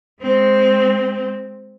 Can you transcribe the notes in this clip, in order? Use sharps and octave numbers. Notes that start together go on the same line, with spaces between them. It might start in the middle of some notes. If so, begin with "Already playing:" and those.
G#3 C4